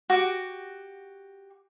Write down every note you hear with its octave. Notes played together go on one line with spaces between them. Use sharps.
F#4 G4 D6